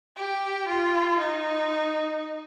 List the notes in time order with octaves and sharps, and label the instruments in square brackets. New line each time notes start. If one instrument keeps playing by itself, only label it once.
[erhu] G4
F4
D#4